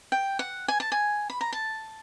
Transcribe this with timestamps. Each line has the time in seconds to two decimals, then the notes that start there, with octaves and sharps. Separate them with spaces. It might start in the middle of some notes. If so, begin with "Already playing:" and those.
0.12 G5
0.39 F#5
0.68 G#5
0.80 A5
0.92 G#5
1.30 B5
1.41 A#5
1.53 A5